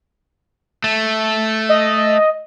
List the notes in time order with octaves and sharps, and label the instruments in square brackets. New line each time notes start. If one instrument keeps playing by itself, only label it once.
[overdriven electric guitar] A3
[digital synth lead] D#5